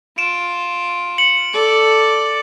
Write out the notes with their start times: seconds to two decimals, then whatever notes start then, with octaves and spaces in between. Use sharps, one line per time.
0.18 F4 D7 E7
1.18 C#7 F#7
1.53 A4 D5